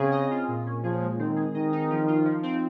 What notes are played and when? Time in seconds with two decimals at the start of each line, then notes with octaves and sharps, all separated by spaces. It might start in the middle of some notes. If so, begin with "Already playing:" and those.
Already playing: C#3 C4 G#4
0.12 D#5
0.31 F4
0.48 A#2
0.66 C#4
0.83 F3 G#4
1.02 G#3
1.19 D#3 C4
1.36 G#4
1.55 D#3 D#5
1.73 D#4
1.90 F3
2.08 F4
2.25 F3
2.43 C4